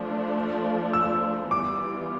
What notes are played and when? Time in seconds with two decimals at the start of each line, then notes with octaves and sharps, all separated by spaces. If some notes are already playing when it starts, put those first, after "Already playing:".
Already playing: F3 A3 D4
0.93 E6
1.51 E3 G3 B3 F4 D6